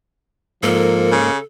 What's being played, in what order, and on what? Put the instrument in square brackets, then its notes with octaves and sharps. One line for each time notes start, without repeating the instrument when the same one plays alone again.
[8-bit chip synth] G#2 A#3 [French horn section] F3 A#4 [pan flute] A4
[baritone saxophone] C#3